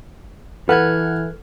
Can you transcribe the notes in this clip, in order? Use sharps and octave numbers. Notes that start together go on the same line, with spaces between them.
E3 A4 B4 F#5 F6 F#6 G#6